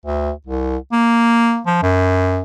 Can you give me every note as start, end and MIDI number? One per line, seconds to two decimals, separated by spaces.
0.05 0.32 38
0.46 0.77 36
0.92 1.61 58
1.67 1.82 53
1.82 2.42 42